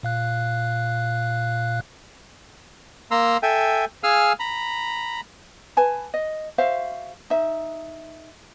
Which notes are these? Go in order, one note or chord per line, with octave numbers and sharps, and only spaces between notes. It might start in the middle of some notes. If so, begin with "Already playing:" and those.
A#2 F5 F#6
A#3 A#5 C6 E6
A4 E5 G5 G#5
G#4 F5 G#5 E6 F6
A#5 B5
B4 G#5 A5
D#5
F#4 C5 E5 F5
D#4 E5